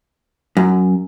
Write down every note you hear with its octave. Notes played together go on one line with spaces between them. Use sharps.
F#2